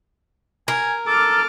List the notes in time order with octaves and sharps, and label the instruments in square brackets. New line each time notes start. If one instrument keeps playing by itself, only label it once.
[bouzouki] A#4 [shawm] G#5
[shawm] A4 [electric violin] D6 F6